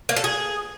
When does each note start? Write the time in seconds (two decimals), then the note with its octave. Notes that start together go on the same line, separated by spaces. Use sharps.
0.09 A#3
0.16 A4
0.24 G#4